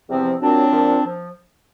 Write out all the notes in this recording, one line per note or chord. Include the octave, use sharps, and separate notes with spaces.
E2 C3 F3 C4
A#2 F#3 C4 D4
A#2 F3
F3